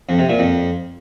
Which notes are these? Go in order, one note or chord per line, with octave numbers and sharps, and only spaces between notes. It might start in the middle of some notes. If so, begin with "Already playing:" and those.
F2
C3
A#2
F2